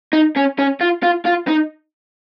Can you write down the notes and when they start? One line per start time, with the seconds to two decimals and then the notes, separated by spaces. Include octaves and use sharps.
0.13 D#4
0.36 C#4
0.59 C#4
0.81 F4
1.03 F4
1.25 F4
1.47 D#4